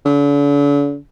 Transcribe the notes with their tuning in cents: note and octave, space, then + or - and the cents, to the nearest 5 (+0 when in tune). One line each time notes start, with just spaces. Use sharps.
D3 -45